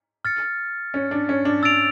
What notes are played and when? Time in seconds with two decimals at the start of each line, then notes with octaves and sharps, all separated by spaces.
0.25 F6 A6 C#7
0.94 C#4
1.11 D4
1.29 C#4
1.45 D4
1.63 E6 A6 D7 F7